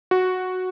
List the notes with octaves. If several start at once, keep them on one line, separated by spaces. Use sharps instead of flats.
F#4